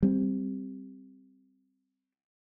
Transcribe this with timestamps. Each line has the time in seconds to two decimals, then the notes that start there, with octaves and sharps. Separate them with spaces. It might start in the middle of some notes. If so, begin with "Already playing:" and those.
0.03 G3 C4